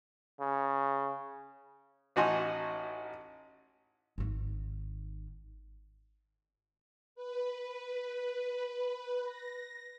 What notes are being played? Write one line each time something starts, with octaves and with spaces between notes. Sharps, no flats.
C#3
A1 D#4 F#4 G#5 C6
G#1 D#3
B4
A#6